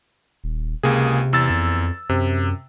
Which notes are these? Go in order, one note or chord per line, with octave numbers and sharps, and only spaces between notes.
D#1
C#2 C3 A#3 G#4
E2 E6 A6
F2
F#2 C3